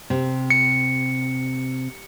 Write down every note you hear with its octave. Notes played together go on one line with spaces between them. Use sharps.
C3
C#7